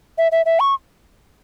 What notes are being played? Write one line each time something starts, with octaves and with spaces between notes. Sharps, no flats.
E5
E5
E5
C#6